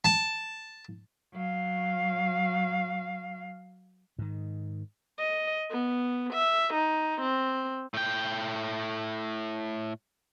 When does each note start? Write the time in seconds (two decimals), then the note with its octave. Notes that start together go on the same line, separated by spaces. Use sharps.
0.04 A5
1.33 F#3 F5
4.18 G#2 D#3
5.18 D#5
5.70 B3
6.33 E5
6.73 D#4
7.21 C4
7.94 A2 G5